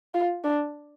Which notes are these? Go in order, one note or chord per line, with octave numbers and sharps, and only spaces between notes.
F4
D4